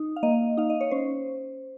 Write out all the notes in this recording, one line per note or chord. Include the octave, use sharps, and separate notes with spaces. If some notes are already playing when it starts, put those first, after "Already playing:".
Already playing: D#4
F5
A#3 D#5
D#4 F5
D#5
C#5
C#4 C5